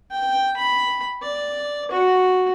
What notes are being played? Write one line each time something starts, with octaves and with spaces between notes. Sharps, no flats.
G5
B5
D5
F#4